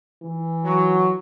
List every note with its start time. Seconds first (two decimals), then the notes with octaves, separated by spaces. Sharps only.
0.22 E3
0.63 F#3